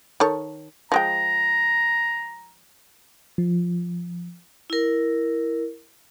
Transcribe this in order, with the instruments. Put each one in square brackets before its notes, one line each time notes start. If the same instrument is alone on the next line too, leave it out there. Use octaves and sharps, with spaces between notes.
[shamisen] D#3 A4 C#5
[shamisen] F3 G#3 G5 [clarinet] A#5
[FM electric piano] F3
[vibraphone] E4 A#4